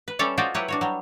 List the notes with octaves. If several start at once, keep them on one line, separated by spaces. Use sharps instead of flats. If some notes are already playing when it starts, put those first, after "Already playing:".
B4
G3 C#4 A4 C#5 D5 E5
F4 F#4 C5 D5 D#5 G5
F#3 E4 G4 B4 C#5 F#5
D4 F#4 C#5
F#3 G3